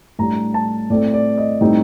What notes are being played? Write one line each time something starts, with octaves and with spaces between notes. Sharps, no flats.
A2 G3 D4 A#5
A5
A2 A3 C4 D5
D5
D#5
A2 G3 C4 D#4